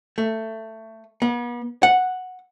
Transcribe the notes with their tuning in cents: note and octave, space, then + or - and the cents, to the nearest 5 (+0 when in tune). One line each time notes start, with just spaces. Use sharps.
A3 +15
B3 -40
F#5 -5